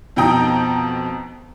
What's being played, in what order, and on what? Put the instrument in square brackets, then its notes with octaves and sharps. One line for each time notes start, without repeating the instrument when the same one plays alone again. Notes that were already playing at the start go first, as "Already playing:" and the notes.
[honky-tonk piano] F2 B2 D#4 G5 A#5 D#6